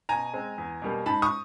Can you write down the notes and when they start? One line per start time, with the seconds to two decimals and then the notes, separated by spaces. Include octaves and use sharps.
0.09 B2 G#5 A#5
0.34 G#3 C4
0.58 E2
0.82 B2 G3 A#3
1.06 G#2 A5 B5
1.22 C#6 D#6